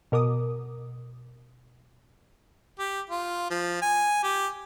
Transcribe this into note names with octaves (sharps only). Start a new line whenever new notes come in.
B2 A#4 D6 D#6
G4
F4
F3
G#5
G4